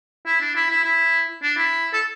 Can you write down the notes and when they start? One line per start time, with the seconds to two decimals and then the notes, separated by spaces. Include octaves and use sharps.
0.26 E4
0.40 D4
0.55 E4
0.70 E4
0.84 E4
1.42 D4
1.57 E4
1.93 A4